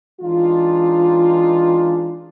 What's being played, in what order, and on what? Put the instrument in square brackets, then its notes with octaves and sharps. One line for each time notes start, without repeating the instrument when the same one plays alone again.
[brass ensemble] E3 G#3 D4 D#4 F4